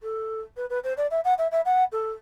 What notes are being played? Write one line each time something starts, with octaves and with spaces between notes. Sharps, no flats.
A4
B4
B4
C5
D5
E5
F#5
E5
E5
F#5
A4